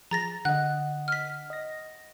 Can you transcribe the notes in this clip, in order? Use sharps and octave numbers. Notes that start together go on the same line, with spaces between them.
F3 G#4 A#5 A6 A#6
D3 D#5 F#5 F#6
F6 B6
D#5 A#6